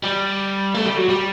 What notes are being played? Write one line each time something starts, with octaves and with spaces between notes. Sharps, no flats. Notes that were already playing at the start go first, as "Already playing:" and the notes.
G3
A3
G3
F#3
G3